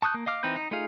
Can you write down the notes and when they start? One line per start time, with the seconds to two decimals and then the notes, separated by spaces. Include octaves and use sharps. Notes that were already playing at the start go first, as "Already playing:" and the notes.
0.02 A5 C#6 D#6 F#6 G6
0.14 A#3
0.26 D#5 F5 D6 F6
0.43 E3 C4 D#4 B4 G6
0.56 D#4
0.71 A3 D#4 F4 G#4 F5